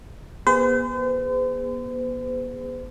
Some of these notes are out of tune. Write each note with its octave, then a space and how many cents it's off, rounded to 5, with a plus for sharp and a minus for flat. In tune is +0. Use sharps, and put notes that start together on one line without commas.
B3 -35 G#4 -20 C5 -45